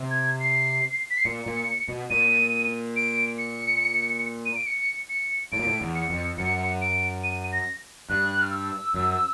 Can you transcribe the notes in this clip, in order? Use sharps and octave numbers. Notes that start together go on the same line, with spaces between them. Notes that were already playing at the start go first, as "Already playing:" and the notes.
Already playing: C3
G#6
C7
B6
C7
A#2 C#7
A#2
B2
A#2 D#7
D7
C#7
D#7
D7
C#7
C#7
A2 D7
A#2
A2
E2
C#7
F2
F#2 C#7
D7
D#7
A#6
G2 F#6
F6
E6
F#2